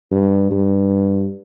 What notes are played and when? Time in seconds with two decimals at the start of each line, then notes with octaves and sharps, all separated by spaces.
0.11 G2
0.51 G2